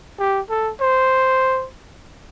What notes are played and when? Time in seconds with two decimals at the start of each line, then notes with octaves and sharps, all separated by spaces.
0.19 G4
0.49 A4
0.81 C5